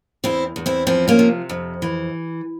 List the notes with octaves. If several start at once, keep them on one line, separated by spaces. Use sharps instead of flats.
E2 C4 E4
E2
C4 E4
F3 C4 E4
A#3 C#4
C3
F2
E3